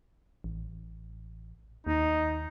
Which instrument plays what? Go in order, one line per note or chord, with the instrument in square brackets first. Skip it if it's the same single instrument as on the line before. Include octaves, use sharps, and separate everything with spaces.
[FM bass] A1
[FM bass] D#2 [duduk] D#4